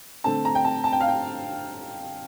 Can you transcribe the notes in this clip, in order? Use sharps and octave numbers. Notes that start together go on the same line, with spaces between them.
D3 A3 C4 A5
A#5
G5
A5
A5
G5
F5
G5